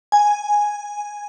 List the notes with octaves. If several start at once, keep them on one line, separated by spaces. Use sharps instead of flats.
G#5